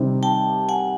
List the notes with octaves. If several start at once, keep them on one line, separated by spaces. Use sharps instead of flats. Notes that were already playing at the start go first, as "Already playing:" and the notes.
Already playing: C3 D#3 G3 C4 D#4
G5 A5
F#5 G#5